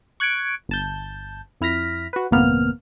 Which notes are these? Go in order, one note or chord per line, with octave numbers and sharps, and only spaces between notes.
C#6 F#6 G#6 C#7 D7
G1 A5 G6
F2 E4 F6 A#6 B6
F#4 B4
G#1 F2 C3 A#3 B3 F6